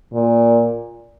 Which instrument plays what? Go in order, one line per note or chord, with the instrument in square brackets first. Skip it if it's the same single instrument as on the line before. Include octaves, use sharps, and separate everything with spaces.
[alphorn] A#2